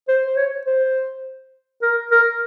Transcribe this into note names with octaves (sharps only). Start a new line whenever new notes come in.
C5
C5
C#5
C5
A#4
A#4